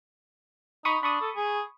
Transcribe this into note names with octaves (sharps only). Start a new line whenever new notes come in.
D#4 B5 C#6 D#6
D4 B5 C#6 D#6
A4
G#4